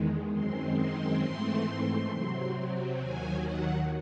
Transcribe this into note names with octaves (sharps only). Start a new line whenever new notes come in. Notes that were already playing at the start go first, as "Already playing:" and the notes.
Already playing: E2 D#3 G#3
F#2 D#3 G#3 C4 C6
C6
G#2 E3 A3 C4 C6
C3 F#3 C4
D#2 D#3 F#3 G#5
F#5